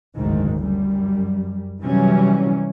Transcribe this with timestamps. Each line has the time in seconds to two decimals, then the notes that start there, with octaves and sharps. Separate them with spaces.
0.16 F#1 D2 G#2 D#3
0.62 F#2 G3
1.82 C3 E3 F#3 G3 C#4